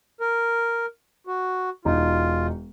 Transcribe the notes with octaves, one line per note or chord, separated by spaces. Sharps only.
A#4
F#4
E1 D#4 F4